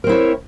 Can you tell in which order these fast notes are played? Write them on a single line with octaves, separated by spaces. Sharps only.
A#4 C4 E4 C#5